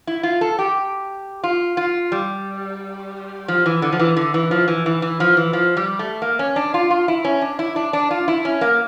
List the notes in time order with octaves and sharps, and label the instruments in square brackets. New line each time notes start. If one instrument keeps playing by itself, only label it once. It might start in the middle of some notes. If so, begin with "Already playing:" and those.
[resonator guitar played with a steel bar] E4
F4
A4
G4
F4
F4
G3
F3
E3
D3
F3
E3
D3
E3
F3
E3
E3
E3
F3
E3
F3
G3
A3
A#3
C#4
D4
F4
F4
E4
C#4
D4
E4
D4
D4
F4
E4
C#4
A#3